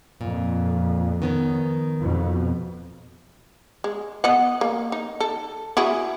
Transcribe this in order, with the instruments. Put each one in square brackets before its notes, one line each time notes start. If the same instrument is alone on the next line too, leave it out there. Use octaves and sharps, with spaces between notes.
[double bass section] F2 [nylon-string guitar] A#2
[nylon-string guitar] D#3 B3 C#4
[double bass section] F2 B2
[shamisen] G#3
B3 D#5 F#5
A#3
D#4
A4
E4 F#4 G#4